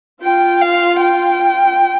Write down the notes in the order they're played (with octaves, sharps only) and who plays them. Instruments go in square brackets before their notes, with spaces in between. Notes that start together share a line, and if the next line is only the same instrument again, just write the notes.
[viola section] F4 [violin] G5
[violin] F5
G5